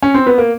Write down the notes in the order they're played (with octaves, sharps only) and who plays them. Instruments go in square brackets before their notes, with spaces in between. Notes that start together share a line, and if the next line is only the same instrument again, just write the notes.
[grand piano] C#4
C4
B3
A#3